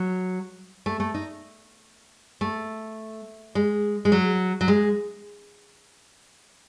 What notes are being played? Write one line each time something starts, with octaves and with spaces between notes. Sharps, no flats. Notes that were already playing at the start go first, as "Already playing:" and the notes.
Already playing: F#3
A3
A3
D#4
A3
G#3
G#3
F#3
F#3
G#3